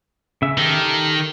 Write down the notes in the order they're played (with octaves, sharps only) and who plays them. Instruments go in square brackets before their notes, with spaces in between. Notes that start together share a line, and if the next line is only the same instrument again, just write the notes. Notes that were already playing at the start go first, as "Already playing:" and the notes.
[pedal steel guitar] C#3 E5
[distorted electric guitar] D#3 [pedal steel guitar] G4 A4 A#4